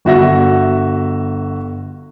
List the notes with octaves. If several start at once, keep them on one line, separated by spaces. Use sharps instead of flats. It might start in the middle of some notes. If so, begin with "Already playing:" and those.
G1 F#4 E5 A#6